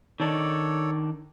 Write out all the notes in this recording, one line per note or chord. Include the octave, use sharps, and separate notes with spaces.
D#3 D4 D#4 A4 C#5 D5